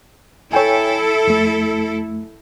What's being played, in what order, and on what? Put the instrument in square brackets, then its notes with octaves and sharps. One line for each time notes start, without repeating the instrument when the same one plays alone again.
[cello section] E4 A4 [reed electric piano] C#5 G5 G#5
[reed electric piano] F2 A3